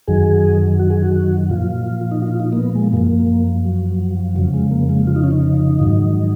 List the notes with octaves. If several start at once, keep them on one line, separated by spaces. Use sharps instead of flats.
F#2 D#3 F#3 G#4
F#4
G#4
F#4
A#2 F3 F4
D#4
F4
D#4
A#3
B3
G#3
F#2 F3 A#3
F#3
F2 C#3 F3 F#3
G#3
A#3
G#3
F4
D#4
C#4
D#4
G#2 D#3 F#3